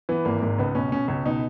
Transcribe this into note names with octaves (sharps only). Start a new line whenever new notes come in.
E3 B3
G#1 A#3
G#2 A#3
C#2 B3
B2 C#4
B2 C#4
C#2 C#4
B2 D#4